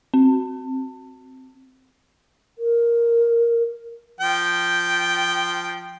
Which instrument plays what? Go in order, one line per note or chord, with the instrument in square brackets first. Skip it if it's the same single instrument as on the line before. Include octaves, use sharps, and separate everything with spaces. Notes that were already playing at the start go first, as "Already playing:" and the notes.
[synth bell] C4
[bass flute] A#4
[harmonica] F3 G5